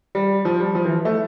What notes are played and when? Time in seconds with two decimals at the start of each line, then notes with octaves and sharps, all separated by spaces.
0.15 G3
0.45 F3
0.60 G3
0.75 F3
0.85 E3
1.05 A3